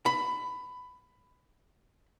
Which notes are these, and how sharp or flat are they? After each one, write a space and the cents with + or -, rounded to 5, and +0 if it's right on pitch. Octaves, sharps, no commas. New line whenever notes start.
B5 +15